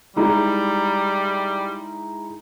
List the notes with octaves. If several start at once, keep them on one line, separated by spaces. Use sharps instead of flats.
G3 G#3 D#4 E4